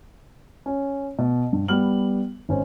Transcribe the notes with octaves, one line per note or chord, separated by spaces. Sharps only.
C#4
B2
G2
G3 B3 F6 F#7
G#1 C#4 C5